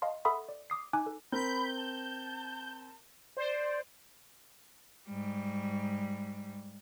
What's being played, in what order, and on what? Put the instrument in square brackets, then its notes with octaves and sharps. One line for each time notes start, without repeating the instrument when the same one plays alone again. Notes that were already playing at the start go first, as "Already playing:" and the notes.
[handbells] D#5 F5 A5 C6
A4 E5 F#5 B5 C6 D#6
D5
D6 D#6 C7
D#4 G#5 D6 F#6
A4
[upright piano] C4 A#4 [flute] B5 [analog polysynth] G6
[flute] A5
[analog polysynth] C5 [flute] D5
[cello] G#2 G3